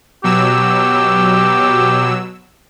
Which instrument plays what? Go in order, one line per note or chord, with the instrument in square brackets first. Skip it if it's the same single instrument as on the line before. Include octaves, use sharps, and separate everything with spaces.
[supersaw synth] B2 F#3 E6 [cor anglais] G4